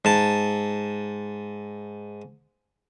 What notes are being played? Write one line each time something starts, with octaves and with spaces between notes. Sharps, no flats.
G#2 A5